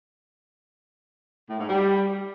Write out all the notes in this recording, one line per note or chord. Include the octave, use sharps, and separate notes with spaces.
A2
G#2
G3